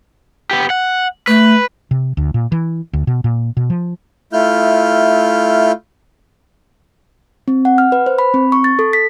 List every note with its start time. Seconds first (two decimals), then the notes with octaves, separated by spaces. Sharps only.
0.51 B3 G4
0.70 F#5
1.27 A3 B4
1.91 C3
2.17 D2
2.34 A#2
2.52 E3
2.93 D2
3.07 B2
3.24 A#2
3.57 B2
3.70 F3
4.33 A3 E4 F4 F6 G6
7.48 C4
7.65 F#5
7.78 F6
7.92 B4
8.06 C5
8.19 B5
8.34 C4
8.52 C#6
8.64 A6
8.79 A4
8.93 B6